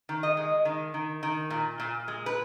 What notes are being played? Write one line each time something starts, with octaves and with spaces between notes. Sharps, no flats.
D#3
D#5
G#3
D#3
D#3
D#3
A#2
A#2
G#3
B4